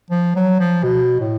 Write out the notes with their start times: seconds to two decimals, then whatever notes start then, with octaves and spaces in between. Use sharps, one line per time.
0.11 F3
0.36 F#3
0.60 F3
0.83 B2
1.20 A2